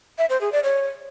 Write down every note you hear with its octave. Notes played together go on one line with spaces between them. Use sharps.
E5
C5
G#4
D5
C#5